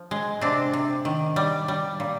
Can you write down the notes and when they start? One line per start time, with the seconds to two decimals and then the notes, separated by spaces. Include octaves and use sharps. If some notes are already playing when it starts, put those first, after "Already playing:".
Already playing: F3
0.11 G#3
0.41 C3 C4 D4
0.73 C3
1.05 D#3
1.36 G3
1.68 G3
2.00 A#2